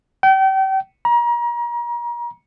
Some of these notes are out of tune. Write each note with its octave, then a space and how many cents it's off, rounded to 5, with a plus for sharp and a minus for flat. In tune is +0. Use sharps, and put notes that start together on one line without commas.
G5 -35
A#5 +35